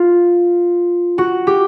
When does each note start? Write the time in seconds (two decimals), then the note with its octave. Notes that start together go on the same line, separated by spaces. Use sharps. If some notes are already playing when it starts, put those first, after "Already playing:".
Already playing: F4
1.18 F#4
1.47 G4